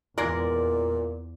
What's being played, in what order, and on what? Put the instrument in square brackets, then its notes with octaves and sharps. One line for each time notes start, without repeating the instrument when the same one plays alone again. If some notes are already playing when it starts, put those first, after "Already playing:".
[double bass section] E2 [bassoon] A#2 [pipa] G#3 A#3 A#4 [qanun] D5